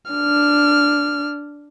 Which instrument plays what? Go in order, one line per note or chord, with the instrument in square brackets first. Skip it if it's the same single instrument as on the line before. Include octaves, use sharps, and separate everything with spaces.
[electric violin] D4 F6